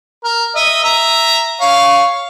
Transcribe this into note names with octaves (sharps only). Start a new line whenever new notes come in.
A#4
D#5 E5
E5 A#5
C#5 F5